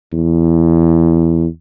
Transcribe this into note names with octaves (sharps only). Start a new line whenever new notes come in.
E2